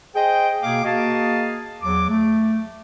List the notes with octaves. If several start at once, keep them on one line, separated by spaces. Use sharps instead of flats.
G#4 C5 D#5 G5
B2 A#3 G#4 F5 D6
A#3 F#4 G#4 D#5 F5 A5
E2 F#3 D6
A3